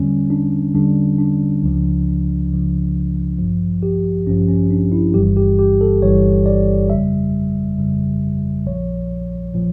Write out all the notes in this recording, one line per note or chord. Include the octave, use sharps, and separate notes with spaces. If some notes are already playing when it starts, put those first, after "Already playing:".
Already playing: E2 D3 G3 C#4
D4
E2 D3 G3 D4
D4
C#2 C#3 F3
C#2 C#3 F3
A1 G2 F3
G4
A1 G2 F3 C#4
C#4
D4
E4
G1 G2 E3 G3 G4
G4
G4
A4
G1 G2 E3 G3 C#5
D5
F2 C#3 G3 E5
F2 C#3 G3
A#1 A#2 F3 C#5
A#2 F3